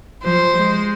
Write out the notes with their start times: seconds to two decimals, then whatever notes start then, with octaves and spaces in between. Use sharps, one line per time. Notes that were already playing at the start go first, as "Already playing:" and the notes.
0.23 F3 C5
0.56 G#3